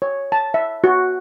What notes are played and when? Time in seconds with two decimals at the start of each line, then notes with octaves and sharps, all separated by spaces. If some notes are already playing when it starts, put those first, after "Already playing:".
0.02 C#5
0.32 A5
0.54 E5
0.84 F#4